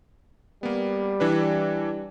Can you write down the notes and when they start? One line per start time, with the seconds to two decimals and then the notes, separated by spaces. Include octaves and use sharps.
0.63 G3 A#3 B3
1.20 E3 D4 B4